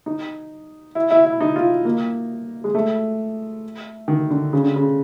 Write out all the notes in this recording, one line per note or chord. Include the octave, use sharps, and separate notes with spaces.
D#4
E4
E4
E4
D#4
F4
A#3
G#3
A3
D#3
D3
C#3
D3
C#3